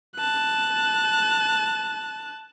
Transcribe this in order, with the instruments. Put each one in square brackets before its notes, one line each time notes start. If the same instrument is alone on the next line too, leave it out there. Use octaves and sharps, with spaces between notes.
[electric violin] A5 F#6